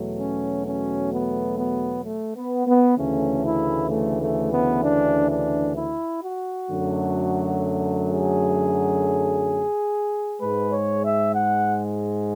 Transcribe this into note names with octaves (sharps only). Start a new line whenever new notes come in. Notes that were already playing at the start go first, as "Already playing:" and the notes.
Already playing: E2 B2 F#3 A3
C#4
C#4
B3
B3
A3
B3
B3
D2 C#3 E3 A3 C#4
E4
A3
A3
B3
D4
D4
E4
F#4
F#2 D3 F#3 A3
G#4
G#2 G#3 B4
C#5
E5
F#5